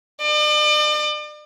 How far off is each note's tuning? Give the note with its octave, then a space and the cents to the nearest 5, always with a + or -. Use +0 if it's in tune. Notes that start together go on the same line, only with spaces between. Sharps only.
D5 +40